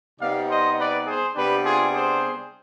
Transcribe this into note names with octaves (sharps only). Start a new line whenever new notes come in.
C3 G3 B3 D#4 D5 F5
C5 D#5
B4 D5
G#4 C5
C3 G3 B3 D4 G4 B4
F4 G#4
G#4 C5